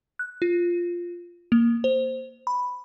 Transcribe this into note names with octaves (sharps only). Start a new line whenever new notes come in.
F#6
F4
A#3
C5
B5